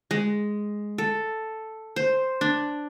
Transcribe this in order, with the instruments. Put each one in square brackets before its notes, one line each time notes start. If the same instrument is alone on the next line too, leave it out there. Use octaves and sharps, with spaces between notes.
[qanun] G#3
A4
C5
D4